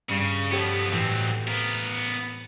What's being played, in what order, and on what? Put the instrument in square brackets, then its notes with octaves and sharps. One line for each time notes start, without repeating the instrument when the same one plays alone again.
[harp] G2 C#7 [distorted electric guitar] C#3
[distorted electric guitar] F3 B3 [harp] G4 A4 C#5
[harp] A2 E3 [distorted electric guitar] F#3 C4
[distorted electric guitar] B3 A#4